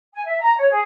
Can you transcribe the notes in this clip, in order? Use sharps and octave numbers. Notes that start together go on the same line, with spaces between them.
G#5
E5
A#5
C#5
G#4